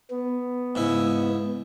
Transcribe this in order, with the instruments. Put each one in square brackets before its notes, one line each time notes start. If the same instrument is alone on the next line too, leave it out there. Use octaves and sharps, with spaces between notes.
[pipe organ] B3
[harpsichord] G#2 C#3 E4